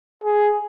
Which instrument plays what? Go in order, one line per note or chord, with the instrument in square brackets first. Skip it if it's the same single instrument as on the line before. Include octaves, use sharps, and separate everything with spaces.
[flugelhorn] G#4